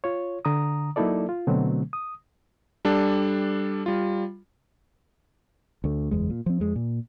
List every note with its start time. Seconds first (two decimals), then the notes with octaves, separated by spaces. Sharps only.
0.04 F4 C#5
0.45 D3 A#5 D#6
0.96 F#3 A#3 D#4 E4 A4 D5
1.29 F4
1.47 B2 D3 F#3 A3 C4
1.93 D#6
2.85 G3 D4 A4
3.86 G3 F4
5.84 D2 A3
6.11 F#1 E2 G#3
6.30 A#2
6.46 F3 C4
6.60 F2 G#3
6.76 A#2